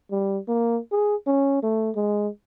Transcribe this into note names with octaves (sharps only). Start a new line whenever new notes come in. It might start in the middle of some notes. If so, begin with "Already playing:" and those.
G3
A#3
G#4
C#4
A3
G#3